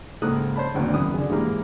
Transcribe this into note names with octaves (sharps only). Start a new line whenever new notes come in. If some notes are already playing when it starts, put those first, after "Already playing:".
C#2 G#2 A#3 A4 D#6 F#6
C5 C#5 A5 B5
G#1 D2 D3 A#3 F#4
F#2 D#3 B3 D#6
D3 G#4
G#2 E3 G3 G#3 A#3 G4